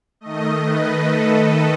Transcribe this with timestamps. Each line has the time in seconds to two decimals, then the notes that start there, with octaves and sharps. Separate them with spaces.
0.21 D#3 A3 D#5
0.63 B4
1.06 A4